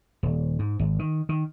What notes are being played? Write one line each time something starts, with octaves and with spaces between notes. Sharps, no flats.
D#1
G#2
G#1
D#3
D#3